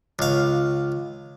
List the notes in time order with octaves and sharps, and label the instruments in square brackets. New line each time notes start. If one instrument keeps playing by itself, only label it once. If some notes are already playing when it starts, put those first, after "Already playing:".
[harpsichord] C#2 F5